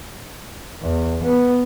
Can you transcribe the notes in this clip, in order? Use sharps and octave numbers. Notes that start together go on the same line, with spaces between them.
E2
B3